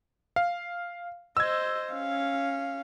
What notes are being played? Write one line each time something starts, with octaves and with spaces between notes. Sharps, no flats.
F5
C5 D#5 E6 G#6
C#4 F5